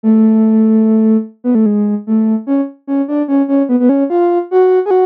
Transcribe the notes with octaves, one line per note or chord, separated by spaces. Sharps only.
A3
B3
A3
G#3
A3
C#4
C#4
D4
C#4
C#4
B3
B3
C#4
F4
F#4
G#4
F#4